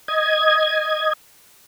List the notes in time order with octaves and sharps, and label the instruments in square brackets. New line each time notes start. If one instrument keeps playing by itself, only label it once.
[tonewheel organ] D#5 G#6